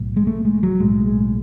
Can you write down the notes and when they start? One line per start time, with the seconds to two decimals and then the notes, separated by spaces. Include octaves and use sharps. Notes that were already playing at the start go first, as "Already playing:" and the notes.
Already playing: B1 A2
0.16 G#3
0.27 A3
0.45 G#3
0.63 F#3
0.80 B1 A2 G#3
1.07 G#3